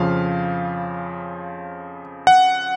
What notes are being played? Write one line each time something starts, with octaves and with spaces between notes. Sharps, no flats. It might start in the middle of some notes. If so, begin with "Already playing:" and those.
Already playing: F2 C#3 F3 F5
F#5